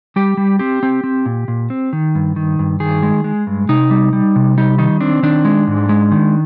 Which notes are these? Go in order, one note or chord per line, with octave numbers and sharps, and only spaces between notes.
G3 G4
G3
C4 G4
C4
C4
A#2
A#2
C4
D#3
G2
D#3
G2
D#3 G#4
G#3
G#3
G2
C3 D#4
G3
G3
C3
G3 D#4
D#3 D#4
C4 D4
D#3 D4
G#3
G#2
G#3
D#3